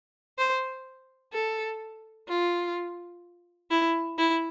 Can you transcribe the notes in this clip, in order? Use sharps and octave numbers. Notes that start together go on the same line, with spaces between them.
C5
A4
F4
E4
E4